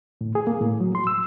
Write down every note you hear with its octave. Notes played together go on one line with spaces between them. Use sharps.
A2
G#4
A#3
A2
F#3
C6
E6